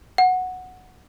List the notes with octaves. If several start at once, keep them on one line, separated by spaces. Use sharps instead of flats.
F#5